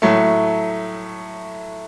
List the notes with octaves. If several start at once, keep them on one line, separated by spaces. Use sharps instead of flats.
A2 F#3 A3